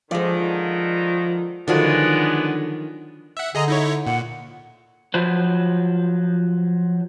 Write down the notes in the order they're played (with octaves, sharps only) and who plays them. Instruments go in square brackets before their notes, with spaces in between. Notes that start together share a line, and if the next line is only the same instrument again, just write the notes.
[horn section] D3 D#3 [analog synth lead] F3 [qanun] G#3 D5
[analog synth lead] D3 [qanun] D#3 F3 F#3 [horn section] G#3 B3 D4
[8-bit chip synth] E5 F#5
[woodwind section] D3 [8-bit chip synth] G#4 D#5 A#5
[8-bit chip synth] D#4 E4 C#5
[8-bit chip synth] A#2 [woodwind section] F#5
[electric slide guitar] F3 F#3 B4 C5